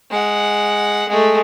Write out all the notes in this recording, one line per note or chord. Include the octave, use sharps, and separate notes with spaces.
G#3 F#5
G#3 A3